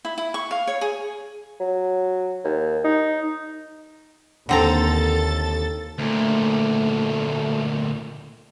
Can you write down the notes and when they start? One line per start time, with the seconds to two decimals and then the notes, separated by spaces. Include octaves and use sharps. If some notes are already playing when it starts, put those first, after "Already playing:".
0.05 E4
0.18 E4
0.34 C#6
0.51 F5
0.67 C#5
0.81 G#4
1.60 F#3
2.44 D#2
2.84 D#4
4.49 D#2 D3 C4 A4 A#5 A6
5.98 D2 A#2 A3